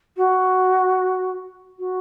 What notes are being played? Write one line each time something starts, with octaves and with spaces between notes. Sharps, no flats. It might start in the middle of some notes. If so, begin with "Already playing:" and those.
F#4
F#4